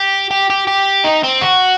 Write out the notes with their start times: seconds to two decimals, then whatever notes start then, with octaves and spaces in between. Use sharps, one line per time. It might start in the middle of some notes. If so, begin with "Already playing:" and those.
Already playing: G4
0.31 G4
0.50 G4
0.67 G4
1.04 D#4
1.24 C4
1.42 F#4